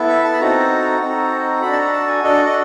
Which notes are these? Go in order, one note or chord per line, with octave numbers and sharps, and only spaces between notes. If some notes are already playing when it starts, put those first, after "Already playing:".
Already playing: B3 E4 A4
E5
A5
B5
C4 D#4 F#4 A4 A#5
C4 D#4 F#4 A4
D4 F#4 A4 B5
A5
A#5
A5
G#5
D4 F#4 A4 D#5
D#5